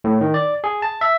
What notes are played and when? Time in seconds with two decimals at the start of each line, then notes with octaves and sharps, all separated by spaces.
0.04 A2
0.21 D#3
0.34 D5
0.64 G#4
0.82 A5
1.01 E5